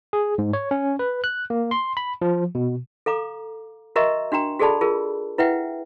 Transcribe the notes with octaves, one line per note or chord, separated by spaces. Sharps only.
G#4
G#2
C#5
C#4
B4
F#6
A#3
C6
B5
F3
B2
A4 F5 A#5 D6
F#4 A#4 D#5 E5 A#5 C#6
D4 F#4 G5 A#5
F#4 G#4 A4 D5 A5 B5
F4 G#4 A#4
E4 B4 E5 F#5 G5